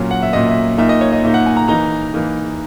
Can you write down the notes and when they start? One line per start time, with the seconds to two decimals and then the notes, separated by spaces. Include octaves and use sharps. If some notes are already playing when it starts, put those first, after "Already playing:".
Already playing: A#2 F#3 C#4
0.11 F#5
0.22 E5
0.33 A#2 F#3 C#4 D#5
0.49 E5
0.78 A#2 A#3 D#4 E5
0.89 D#5
1.01 C#5
1.12 D#5
1.23 A#2 A#3 D#4 E5
1.34 F#5
1.46 G#5
1.57 A#5
1.68 E3 A#3 D#4 A#5
2.14 E3 A#3 D#4